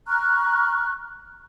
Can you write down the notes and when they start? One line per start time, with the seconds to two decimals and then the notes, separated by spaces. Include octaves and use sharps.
0.07 A#5 C#6 F6 F#6